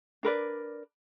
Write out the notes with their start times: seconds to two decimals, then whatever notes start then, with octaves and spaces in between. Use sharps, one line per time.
0.23 D4 A#4 B4 D5